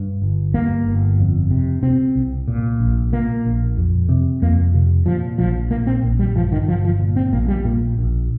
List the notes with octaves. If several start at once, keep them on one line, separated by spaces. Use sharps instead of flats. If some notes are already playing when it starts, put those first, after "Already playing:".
Already playing: G2
G1
G2 A#3
G1
F2
C3
C3 C4
C2
A#2
A#1
A#2 A#3
A#1
F2
C3
F2 A#3
C3
A#2 F3
A#1 F3
A#2 A#3
C4
A#1
G3
G2 F3
D#3
G1 F3
F3
A#2
C4
A#1 A#3
G3
A#2 A#3
A#1